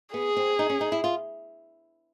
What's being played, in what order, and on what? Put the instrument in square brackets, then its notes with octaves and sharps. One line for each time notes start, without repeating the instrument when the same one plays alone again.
[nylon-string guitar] B3 [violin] G#4
[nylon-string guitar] C4
D#4
C#4
D#4
E4
F4